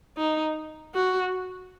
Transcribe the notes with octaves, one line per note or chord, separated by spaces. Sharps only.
D#4
F#4